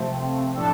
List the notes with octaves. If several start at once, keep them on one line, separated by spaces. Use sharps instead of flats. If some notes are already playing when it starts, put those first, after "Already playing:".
Already playing: C3 F3 A3 C4
A2 F3 A3 D4 A4